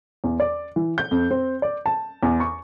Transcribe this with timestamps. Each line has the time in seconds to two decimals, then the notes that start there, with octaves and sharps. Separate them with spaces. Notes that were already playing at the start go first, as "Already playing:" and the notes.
0.24 E2
0.40 D5
0.76 E3
0.98 G6
1.11 F2
1.31 C4
1.62 D5
1.86 A5
2.23 E2
2.40 C#6